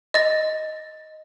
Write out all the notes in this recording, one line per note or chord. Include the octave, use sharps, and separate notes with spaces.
D#5 A6